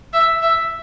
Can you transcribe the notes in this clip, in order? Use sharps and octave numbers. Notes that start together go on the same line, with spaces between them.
E5
E5